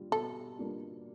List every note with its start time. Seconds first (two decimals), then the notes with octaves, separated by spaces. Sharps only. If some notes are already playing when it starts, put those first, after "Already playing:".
Already playing: G3 A#3 D4 F4
0.11 B2 A4
0.59 G3 A#3 D4 F4